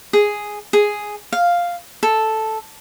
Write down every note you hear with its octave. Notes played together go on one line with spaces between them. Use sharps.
G#4
G#4
F5
A4